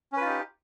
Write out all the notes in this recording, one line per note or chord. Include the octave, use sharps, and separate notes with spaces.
C#4 D#4 F4 G4 B4